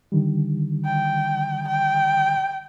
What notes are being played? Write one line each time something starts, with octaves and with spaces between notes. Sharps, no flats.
D3 D#3 G3
G5
G5